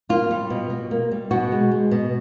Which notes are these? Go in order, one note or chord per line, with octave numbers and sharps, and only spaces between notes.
A#3 F4
G3
B2
B2
A#3
G3
B2 F#4
G#3
G#3
B2